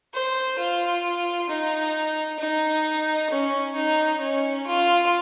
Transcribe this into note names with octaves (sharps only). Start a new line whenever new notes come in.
C5
F4
D#4
D#4
C#4
D#4
C#4
F4